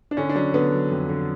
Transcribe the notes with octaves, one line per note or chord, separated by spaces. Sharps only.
D4
D3 C#4
D4
F#3 C#4
D3 B3
F#3
F2
D3